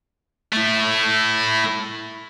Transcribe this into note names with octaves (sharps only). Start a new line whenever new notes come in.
A3 E4